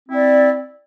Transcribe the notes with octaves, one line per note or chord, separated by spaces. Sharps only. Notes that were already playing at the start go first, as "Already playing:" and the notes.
C4 E4 D5